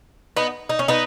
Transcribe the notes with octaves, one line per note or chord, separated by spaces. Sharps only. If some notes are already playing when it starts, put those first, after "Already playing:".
B3 D#4
D#4
C#4
B3 D#4